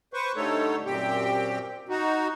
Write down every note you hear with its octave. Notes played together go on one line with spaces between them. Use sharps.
B4 C5 C#6
D3 G3 A3 D#4 A4 C#5
F#2 A#2 C4 G4 G5
D#4 F#4